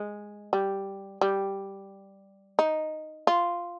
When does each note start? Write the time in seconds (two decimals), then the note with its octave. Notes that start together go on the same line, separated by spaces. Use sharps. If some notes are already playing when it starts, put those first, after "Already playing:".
Already playing: G#3
0.53 G3
1.21 G3
2.59 D#4
3.27 F4